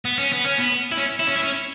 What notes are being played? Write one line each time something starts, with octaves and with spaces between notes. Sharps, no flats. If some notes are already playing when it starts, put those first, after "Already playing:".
B3
C#4
B3
C#4
B3
E4
C#4
E4
C#4
E4
C#4